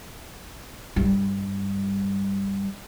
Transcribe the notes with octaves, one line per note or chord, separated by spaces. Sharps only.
G2 G3